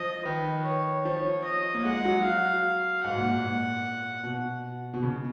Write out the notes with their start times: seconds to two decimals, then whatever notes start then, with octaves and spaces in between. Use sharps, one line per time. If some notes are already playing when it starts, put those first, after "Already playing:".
Already playing: F3 D#5
0.26 D#3 B4
0.65 C#5
1.05 F3 C#5
1.44 D#5
1.75 A#3
1.85 G#3 F#5
2.05 F#3
2.25 F5
3.04 G#2 F#5
3.18 A#2
3.31 G#2
3.44 A#2
4.24 B2
4.94 B2
5.03 C#3